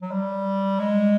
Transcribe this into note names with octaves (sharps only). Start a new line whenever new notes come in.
F#3
G3
G#3